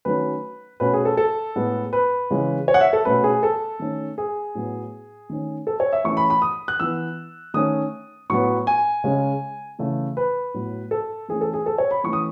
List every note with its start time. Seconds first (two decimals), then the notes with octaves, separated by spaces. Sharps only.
0.05 D#3 F#3 A3 C#4 B4
0.80 B2 A3 C#4 B4
0.94 G#4
1.05 A4
1.17 A4
1.56 A2 G#3 B3
1.93 B4
2.31 C#3 E3 G#3 C#4
2.68 C#5
2.74 F#5
2.81 E5
2.93 A4
3.05 B2 A3 C#4 B4
3.24 G#4
3.43 A4
3.80 D#3 A3 C#4
4.18 G#4
4.55 A2 F#3 B3
5.30 D#3 A3 C#4
5.67 A4
5.80 C#5
5.93 E5
6.04 E3 A3 C#4 C#6
6.17 B5
6.30 B5
6.42 D#6
6.68 F#6
6.80 E3 B3 E6
7.54 D#3 A3 C#4 D#6
8.30 A2 F#3 B3 C#6
8.67 G#5
9.04 C#3 G#3 C#4
9.79 C#3 E3 A3
10.17 B4
10.54 A2 F#3 B3
10.91 A4
11.28 E3 A3 C#4 G#4
11.41 A4
11.53 G#4
11.66 A4
11.78 C#5
11.91 B5
12.04 E3 A3 C#4 C#6
12.13 D#6